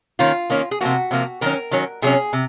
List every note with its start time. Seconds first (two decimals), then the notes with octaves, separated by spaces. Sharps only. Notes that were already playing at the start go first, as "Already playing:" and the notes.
0.19 D#3 A#3 C#4 F4
0.50 D#3 A#3 C#4
0.71 G#4
0.81 C3 F3 A#3 F#4
1.11 C3 F3 A#3
1.41 D#3 F#3 C#4 A#4
1.71 D#3 F#3 C#4
2.02 C3 F#3 C#4 G#4
2.33 C3